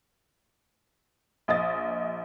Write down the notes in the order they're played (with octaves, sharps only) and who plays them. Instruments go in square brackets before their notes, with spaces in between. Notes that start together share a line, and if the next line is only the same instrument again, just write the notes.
[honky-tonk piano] A#1 D#5 D#6 A6